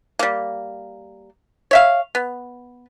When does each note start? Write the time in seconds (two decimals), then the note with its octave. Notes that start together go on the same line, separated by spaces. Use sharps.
0.19 G3 A#3
1.71 C#5 E5 F5
2.15 B3